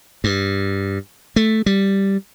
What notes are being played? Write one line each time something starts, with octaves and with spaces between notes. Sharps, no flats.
G2
A3
G3